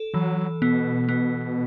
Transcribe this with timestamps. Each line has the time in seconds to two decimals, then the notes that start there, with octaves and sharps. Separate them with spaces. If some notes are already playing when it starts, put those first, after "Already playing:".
Already playing: A4
0.14 E3 F#3
0.62 B2 B3
1.09 B3